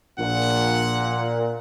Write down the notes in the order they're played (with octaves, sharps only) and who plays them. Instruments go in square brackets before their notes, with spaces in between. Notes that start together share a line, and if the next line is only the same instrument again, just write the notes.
[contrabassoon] A#1 [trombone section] A#2 [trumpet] F#5